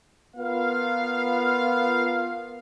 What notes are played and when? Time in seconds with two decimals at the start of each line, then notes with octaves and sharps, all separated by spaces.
0.36 B3 F4 A#4 F5